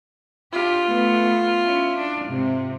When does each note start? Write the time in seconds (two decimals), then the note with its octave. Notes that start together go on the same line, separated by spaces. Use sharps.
0.53 D4 F4 G4
0.85 A3 B3
1.62 C#4 E4
1.97 D4
2.26 G#2 C3